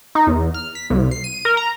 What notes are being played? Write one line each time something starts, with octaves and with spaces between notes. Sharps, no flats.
D#4
E2
F6
B6
C2
C7
D#7
A#4
A#5